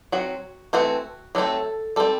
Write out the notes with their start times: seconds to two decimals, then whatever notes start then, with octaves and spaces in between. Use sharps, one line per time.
0.12 F#3 C4 F#4
0.73 E3 A3 C4 F#4
1.35 F#3 A3 C4 A4
1.96 G3 C4 A4